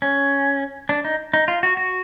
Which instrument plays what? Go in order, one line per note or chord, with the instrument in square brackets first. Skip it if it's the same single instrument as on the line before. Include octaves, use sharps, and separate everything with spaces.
[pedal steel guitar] C#4
D4
D#4
D#4
F4
F#4
F#4